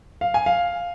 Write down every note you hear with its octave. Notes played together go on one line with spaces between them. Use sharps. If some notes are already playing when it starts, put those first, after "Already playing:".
F5
G#5
F5